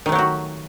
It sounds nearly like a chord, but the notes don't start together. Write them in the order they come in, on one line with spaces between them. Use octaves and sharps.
D#3 A3 F#3 G4 F#4